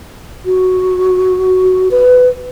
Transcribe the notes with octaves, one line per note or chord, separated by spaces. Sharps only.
F#4
B4